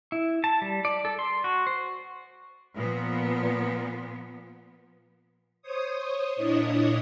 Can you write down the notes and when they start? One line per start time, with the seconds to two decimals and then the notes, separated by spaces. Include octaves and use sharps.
0.12 E4
0.44 A5
0.62 G3
0.85 D5
1.05 A4
1.19 C6
1.44 F#4
1.67 C5
2.77 A#2 F3 B3
5.62 C5 C#5 D#6
6.36 A#2 D4 E4 C#5 D#5 D#6